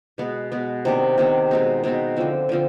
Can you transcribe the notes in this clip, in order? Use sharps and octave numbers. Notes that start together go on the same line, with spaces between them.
B2 G#3 B3
B2 G#3 B3
C3 D#3 B3 D4
C3 D#3 B3 D4
B2 G#3 C4 D#4
B2 G#3 C4 D#4
D3 F3 C4
D3 F3 C4